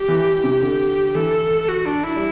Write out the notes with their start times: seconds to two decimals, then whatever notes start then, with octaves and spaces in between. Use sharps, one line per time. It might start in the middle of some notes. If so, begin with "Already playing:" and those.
Already playing: G4
0.08 E3
0.44 C3
0.62 D3
1.15 E3 A4
1.69 F#4
1.86 D4
2.04 E4
2.16 G3